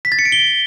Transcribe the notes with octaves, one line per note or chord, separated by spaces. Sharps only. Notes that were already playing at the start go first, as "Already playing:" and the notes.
B6
A6
C#7
D7
G7